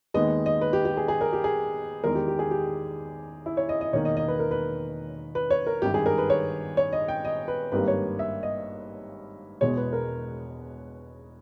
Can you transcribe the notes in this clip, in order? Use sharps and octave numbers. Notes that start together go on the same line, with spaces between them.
D#2 D#3 G#3 B3 D#5
D#5
B4
G4
G4
G#4
G#4
A#4
G4
G#4
E2 D#3 G#3 A#4
G4
G4
G#4
G4
E4
C#5
D#5
D#5
E1 E2 D#3 A#3 C#5
D#5
D#5
B4
A#4
B4
B4
C#5
A#4
G#1 G2 D#3 G4
G#4
A#4
B4
C#5
C#5
D#5
G5
D#5
B4
G#1 G2 G3 A#3 B4
C#5
E5
D#5
E1 E2 B2 G#3 C#5
B4
A#4